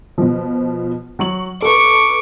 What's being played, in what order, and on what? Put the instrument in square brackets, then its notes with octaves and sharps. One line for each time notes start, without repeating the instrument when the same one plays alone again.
[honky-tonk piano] B2 F3
F#3 C#6 F#7
[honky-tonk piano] A4 B4 [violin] C#6 D6